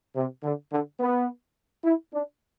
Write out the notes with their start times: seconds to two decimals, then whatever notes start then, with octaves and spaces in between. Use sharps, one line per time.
0.15 C3
0.43 D3
0.72 D3
1.00 B3
1.84 E4
2.13 D4